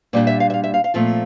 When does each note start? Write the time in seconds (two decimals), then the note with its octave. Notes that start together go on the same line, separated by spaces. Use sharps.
0.13 A#2 G3 D4 D5
0.27 E5
0.40 F5
0.50 E5
0.54 F5
0.64 E5
0.74 F5
0.84 F5
0.94 A#2 F3 A3 C4 F4